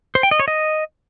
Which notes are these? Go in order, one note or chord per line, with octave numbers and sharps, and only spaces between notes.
C5
G5
D#5
C#5
D#5